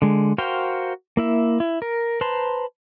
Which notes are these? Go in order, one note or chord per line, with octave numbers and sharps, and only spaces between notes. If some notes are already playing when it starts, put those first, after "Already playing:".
D3 G#3
F#4 A#4 C5 F5 G5
A#3 E4 E5
E4
A#4
B4 C5 A5 A#5 C6